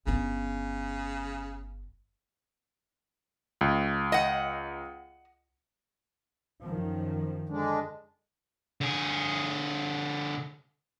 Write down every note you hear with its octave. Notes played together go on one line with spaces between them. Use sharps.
G1 C#3 B3
C#2
D#5 F#5
F#2 D#3 F3
D3 G#3 D4
D3 G#4